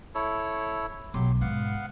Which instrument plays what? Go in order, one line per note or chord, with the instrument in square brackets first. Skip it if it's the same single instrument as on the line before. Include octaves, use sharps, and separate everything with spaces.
[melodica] E4 A4 C#5
[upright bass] B1 [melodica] F#3 G4 C6
[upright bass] G#2 [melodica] B3 F5 F#5